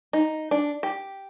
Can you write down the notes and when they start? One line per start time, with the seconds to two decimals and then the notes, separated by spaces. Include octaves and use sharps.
0.13 D#4
0.51 D4
0.83 G4